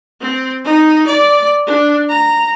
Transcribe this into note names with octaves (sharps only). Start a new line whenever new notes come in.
C4
D#4
D5
D4
A#5